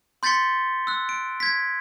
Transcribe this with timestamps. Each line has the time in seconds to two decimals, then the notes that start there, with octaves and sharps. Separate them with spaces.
0.23 C6 G6 A6 B6 C#7 G7
0.87 E6 F#6
1.09 D7
1.40 G#6 B6